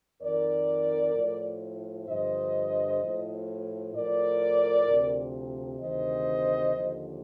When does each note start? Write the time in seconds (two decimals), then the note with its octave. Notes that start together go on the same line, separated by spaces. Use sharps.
0.22 F2 D#3 A#4 D5
1.15 A2 F3
2.08 G2 D3 F3 C5 D#5
3.01 A2 F3
3.95 A2 F3 A#4 D5
4.88 D2 C3 F3
5.81 D2 C3 D#3 C5 D#5
6.75 D#2 D3 F3